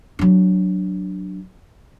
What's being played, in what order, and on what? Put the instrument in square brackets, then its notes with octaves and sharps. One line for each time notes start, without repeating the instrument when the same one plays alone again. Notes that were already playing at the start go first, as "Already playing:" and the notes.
[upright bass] F#3 D4